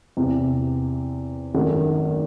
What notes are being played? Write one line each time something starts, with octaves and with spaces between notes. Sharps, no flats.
E2 C3 E3 C4
G#1 F#2 D#3 A3